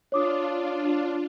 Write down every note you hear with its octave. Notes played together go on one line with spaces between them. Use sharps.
D4 F4 C#5 D6 D#6